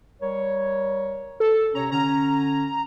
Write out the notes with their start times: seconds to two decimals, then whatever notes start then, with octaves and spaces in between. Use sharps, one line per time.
0.22 G3 A#4 C#5
1.40 A4
1.75 C3 C#4 C#5 A#5
1.92 D3 C#4 A#5